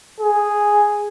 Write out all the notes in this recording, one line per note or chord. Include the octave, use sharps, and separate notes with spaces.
G#4